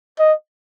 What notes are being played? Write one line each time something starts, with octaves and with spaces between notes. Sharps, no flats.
D#5